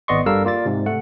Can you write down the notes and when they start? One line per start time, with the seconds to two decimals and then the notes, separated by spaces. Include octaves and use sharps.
0.08 G#1 B3 D5 D#5 C6 C#6
0.26 G2 G3 A4 A#4 F5 E6
0.45 A#3 F4 D5 A6
0.65 G#2 C3
0.86 A3 F#5